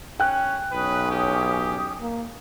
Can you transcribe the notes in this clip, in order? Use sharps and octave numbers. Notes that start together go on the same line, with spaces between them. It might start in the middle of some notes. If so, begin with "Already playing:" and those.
C#4 G5 F#6
B1 C#4 B4 D#6
G4
A#3